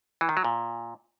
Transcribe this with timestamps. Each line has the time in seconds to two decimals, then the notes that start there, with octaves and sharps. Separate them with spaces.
0.21 E3
0.29 D#3
0.37 F#3
0.45 A#2